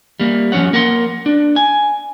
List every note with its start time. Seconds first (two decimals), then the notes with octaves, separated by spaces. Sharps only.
0.20 G3 A#3
0.52 F3 F#3 C#4 C#5 F#5
0.73 A#3 A#4 F#5 A5 C6
1.26 D4
1.56 G#5